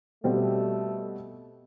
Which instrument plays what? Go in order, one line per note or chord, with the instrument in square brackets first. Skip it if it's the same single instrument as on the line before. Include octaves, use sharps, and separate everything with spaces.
[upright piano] B2 G3 C4 F#4 [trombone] A3